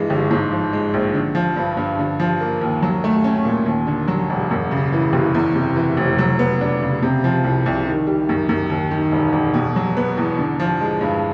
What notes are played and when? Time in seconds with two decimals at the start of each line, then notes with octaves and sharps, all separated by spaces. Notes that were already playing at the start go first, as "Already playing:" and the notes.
Already playing: G2 E3 G#3
0.10 G1
0.31 G#2
0.51 F3
0.73 G#3
0.94 A#1
1.14 D3
1.35 F3
1.56 G2
1.77 G2
1.99 D3
2.20 F3
2.41 A#3
2.61 D#2
2.82 F#3
3.04 A3
3.24 C#4
3.45 A#2
3.66 D#2
3.87 D3
4.08 F#3
4.30 E1
4.51 F#2
4.71 C#3
4.92 E3
5.13 F#1
5.34 E2
5.55 C3
5.76 E3
5.97 F1
6.18 F#3
6.39 B3
6.61 D4
6.82 C#3
7.02 C3
7.24 F3
7.44 C2
7.66 C2
7.87 D#3
8.07 G3
8.29 F#2
8.49 F#2
8.70 D#2
8.91 D#3
9.12 E1
9.33 E1
9.54 B2
9.76 F#3
9.97 B3
10.17 E2
10.39 D3
10.60 F3
10.81 G#3
11.01 G2